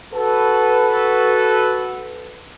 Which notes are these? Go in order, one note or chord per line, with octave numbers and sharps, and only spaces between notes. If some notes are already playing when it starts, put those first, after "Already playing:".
F#4 A4 B4